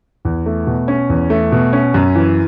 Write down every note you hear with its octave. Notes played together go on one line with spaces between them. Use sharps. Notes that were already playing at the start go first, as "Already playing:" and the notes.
E2
A3
B2
C#4
E2
A3
B2
C#4
F#2
E3